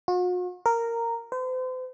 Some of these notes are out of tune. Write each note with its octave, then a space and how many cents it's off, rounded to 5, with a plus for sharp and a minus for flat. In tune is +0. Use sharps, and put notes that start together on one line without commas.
F#4 -45
A#4 -10
C5 -40